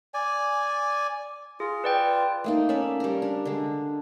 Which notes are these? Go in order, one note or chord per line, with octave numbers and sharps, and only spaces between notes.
D5 G#5
F4 G#4
B4 D5 G5
A3 A#3 D#4
C#4 D5 E5
G3 A#4
D4
D3 G#3